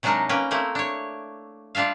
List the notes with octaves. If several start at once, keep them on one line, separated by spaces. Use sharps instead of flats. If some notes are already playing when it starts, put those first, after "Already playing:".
C3 F#3 G#3 D4 D#4 A#4
A#3 C#4 B4 G5
A3 A#3 C4 E4
D4 C#5
G3 D4 F4 E5 F5